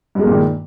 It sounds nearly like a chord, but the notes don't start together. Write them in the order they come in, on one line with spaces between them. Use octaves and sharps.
G2 G#3 A#3 A#2 D#3